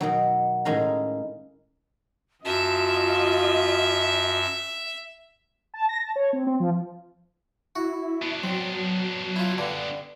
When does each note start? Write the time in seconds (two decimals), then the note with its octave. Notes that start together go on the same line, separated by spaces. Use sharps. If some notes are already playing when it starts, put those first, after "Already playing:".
0.01 B2 D#3 F#3
0.65 A2 D#3 G#3 C#4 F5 A#5
2.45 F#2 F4 F#4 D#5 E5 A5
5.74 A5
5.89 A#6
6.01 A5
6.16 C#5
6.33 C4
6.47 C4
6.60 F3
7.76 E4 F#4
8.22 B3 D4
8.43 F#3 C4
9.36 E4 F4
9.58 G2 D3